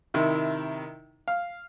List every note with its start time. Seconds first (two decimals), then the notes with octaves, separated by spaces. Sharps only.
0.14 C3 D#3 E4
1.28 F5